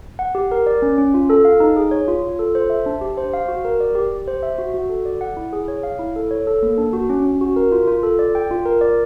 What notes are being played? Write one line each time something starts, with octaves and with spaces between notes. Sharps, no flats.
F#5
G4
A#4
D5
C#4
C#4
F4
A4
F5
D#4
G#4
C#5
F4
F4
A4
C5
E5
D4
G4
C5
F5
F#4
A#4
D5
G4
G4
C5
E5
F#4
F#4
A4
D5
F#5
E4
G#4
C#5
F5
E4
A4
C#5
A4
A#3
D4
F#4
C#4
C#4
F#4
A#4
F4
F4
A4
D5
G5
F4
A#4
D5